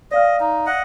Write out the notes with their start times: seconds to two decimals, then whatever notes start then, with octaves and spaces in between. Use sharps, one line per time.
0.11 D5 D#5 F5 F6
0.40 D#4
0.66 D#5 F#5